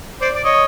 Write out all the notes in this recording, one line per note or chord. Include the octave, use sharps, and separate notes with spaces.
C5 D5
D5
C#5 D#5